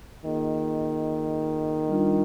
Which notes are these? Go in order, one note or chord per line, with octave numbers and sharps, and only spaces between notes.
D#3 A#3 F4 G#4 D#5
G3 D4 F4